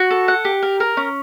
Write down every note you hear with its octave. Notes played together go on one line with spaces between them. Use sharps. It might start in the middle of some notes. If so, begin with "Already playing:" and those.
Already playing: F#4
A4
F#5
G4
A#4
A#4
C#4